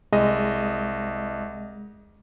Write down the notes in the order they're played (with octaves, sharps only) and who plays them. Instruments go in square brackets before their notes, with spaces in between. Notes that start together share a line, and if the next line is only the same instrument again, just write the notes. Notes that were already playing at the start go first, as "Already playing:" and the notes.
[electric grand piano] C2 D#5 [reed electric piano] G#3